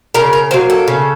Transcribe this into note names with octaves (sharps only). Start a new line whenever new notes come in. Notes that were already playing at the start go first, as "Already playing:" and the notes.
C#3 A#4
A#4
F#3 A#3 C5
A4
C#3